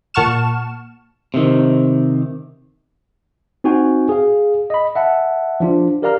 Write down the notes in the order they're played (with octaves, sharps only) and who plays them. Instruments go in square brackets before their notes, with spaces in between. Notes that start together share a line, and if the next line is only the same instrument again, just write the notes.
[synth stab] A#2 F#5 A5 C#6 F6 E7
[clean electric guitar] C3 D#3
[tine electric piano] C4 D#4 F#4 G5 G#5
G#4 F5
D#5 B5
E5 F#5 A5
F3 D4 F4
G4 A#4 D5 F5 A#5 F6